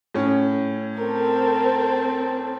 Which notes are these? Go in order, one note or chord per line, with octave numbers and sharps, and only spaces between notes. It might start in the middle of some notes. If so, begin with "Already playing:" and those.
A2 C#4
C4 A4 A#4